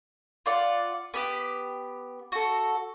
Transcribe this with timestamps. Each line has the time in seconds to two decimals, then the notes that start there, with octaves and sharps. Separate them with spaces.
0.46 F4 D5 F#5
1.14 B3 G4
2.32 F#4 A4